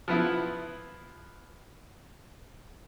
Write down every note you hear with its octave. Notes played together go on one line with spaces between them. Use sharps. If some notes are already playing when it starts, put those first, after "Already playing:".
F3 B3 E4